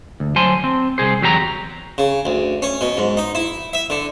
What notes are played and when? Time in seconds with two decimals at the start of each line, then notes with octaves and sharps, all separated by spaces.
0.20 D2
0.36 F#3 C5 G#5 A5 C6
0.64 C4
0.98 C2 G#4 C5
1.22 E2 F#3 G4 C5 A#5
1.98 C#3
2.25 D2
2.62 C#4
2.81 B2
2.97 G#2
3.17 D#4
3.35 E4
3.73 E5
3.90 D3